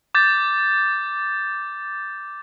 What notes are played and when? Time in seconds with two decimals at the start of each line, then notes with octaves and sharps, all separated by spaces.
0.14 D6 G6 A6